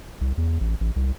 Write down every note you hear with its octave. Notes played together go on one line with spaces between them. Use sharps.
C2
E2
A1
A1
C2